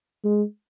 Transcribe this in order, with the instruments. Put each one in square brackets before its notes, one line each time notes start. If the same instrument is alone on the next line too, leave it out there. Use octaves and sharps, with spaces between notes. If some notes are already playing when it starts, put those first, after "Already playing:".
[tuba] G#3